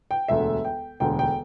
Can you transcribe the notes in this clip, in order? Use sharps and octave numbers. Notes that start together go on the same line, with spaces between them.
G5
E1 D2 D3 E5
G5
E1 D2 D3 G5
G5